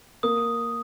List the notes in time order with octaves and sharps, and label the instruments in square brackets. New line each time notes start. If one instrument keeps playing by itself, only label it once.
[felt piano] A#3 [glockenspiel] D#6